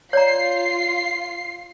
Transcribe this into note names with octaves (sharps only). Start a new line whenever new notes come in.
F4 C#5 D5 A#5 C7